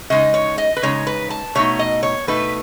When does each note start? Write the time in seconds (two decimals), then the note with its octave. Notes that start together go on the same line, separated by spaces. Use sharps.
0.10 C#3 G#3 D#4 D#5
0.34 C#5
0.58 D#5
0.77 B4
0.83 C#3 G#3 D#4 C#5
1.07 B4
1.30 A5
1.55 B2 A3 D#4 C#5
1.79 D#5
2.03 C#5
2.27 B2 A3 D#4 B4